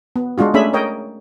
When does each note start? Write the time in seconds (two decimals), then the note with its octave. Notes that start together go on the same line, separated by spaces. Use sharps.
0.16 B3
0.38 G#3 D4 F4 F#4
0.54 A3 C#4 D4 G#4 E5 B5
0.73 A#4 C#5 D#5 G5